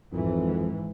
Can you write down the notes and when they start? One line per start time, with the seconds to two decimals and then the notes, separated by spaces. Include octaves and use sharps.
0.13 G#1 F2 G#2 E3